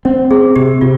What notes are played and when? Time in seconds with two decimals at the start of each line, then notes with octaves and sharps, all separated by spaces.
0.05 C4 C#4
0.31 C4 G#4
0.56 C3 G4
0.81 C3 F4